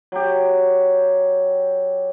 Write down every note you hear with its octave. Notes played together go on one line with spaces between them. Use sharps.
F#3 G4